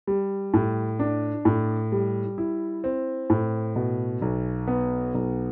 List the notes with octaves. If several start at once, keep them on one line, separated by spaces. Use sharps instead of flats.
G3
A2
D4
A2
G3
E4
C4
A2
B2
B1
B3
B1